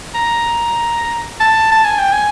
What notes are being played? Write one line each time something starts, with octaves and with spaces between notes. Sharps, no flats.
A#5
A5
A5
G#5
G5
G#5